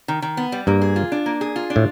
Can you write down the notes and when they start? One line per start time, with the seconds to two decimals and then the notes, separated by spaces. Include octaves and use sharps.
0.08 D#3
0.22 D#3
0.37 B3
0.52 G3
0.67 G2 A#3
0.81 G#4
0.96 F4
1.12 D4
1.26 A#3
1.41 G#4
1.56 F4
1.70 D4
1.76 A2